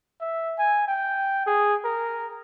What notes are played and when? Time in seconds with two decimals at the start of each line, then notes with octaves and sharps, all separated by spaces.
0.21 E5
0.59 G#5
0.88 G5
1.47 G#4
1.84 A#4